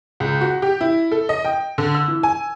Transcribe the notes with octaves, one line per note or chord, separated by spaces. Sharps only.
C#2
F#4
G4
E4
A4
D#5
G5
D3
E6
E3
G#5